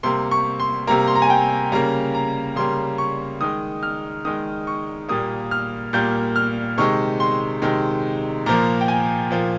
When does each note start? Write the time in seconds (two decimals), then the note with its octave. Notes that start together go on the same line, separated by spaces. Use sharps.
0.03 C3 G3 A#3 C6
0.31 C#6
0.60 C6
0.87 C3 G3 A#3 A#5
1.07 C6
1.15 A#5
1.22 G#5
1.30 G5
1.72 C#3 G3 A#3 A#5
2.15 A#5
2.56 C#3 G3 A#3 C6
2.98 C#6
3.41 D#3 G#3 D#6
3.83 F6
4.25 D#3 G#3 D#6
4.67 C#6
5.09 A#2 G3 A#3 D#6
5.51 F6
5.93 A#2 G3 A#3 G6
6.36 F6
6.78 C3 D#3 G#3 C#6
7.20 C6
7.62 C3 D#3 G#3
8.46 A#2 F3 A#3 A#5
8.81 G5
8.88 G#5
9.31 A#2 F3 A#3